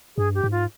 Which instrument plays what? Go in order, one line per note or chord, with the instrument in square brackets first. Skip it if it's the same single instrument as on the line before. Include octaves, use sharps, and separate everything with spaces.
[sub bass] G2 [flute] G#4
[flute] G4
[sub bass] G#2
[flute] F4